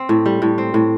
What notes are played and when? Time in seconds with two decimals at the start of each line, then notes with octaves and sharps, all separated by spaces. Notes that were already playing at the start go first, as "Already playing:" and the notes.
Already playing: C4
0.09 A2
0.26 G3
0.42 A2
0.58 C4
0.74 A2